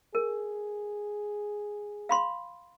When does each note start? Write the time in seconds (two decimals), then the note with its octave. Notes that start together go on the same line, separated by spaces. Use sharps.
0.15 G#4 A#4
2.09 F5 B5 C6